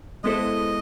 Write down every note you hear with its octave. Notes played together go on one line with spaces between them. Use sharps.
G#3 B3 E4 A4 C5 D#5